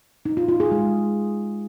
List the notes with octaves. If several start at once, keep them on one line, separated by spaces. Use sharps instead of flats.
D#4
F4
F4
G#4
G#3